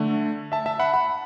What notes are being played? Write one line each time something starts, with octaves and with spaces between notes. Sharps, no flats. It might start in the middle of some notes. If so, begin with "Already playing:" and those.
Already playing: D3 A3
E5 A5
E5 A5
F#5 B5
F#5 B5